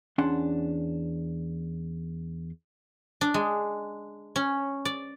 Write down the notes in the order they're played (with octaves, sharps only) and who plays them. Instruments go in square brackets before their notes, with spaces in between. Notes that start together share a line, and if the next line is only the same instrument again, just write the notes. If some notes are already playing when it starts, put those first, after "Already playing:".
[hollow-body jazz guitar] E2 C#4 D4 F#5 C6
[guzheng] D4
G#3
C#4
D5